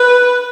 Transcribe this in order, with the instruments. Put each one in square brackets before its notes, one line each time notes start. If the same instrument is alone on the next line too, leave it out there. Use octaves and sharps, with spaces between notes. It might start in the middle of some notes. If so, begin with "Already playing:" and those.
Already playing: [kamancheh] B4